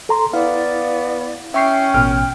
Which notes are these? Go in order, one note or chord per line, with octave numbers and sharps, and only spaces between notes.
A4 A#5 C6
B3 E4 D5 F5
C#4 E5 G5 C#6 C7
A1 B2 F6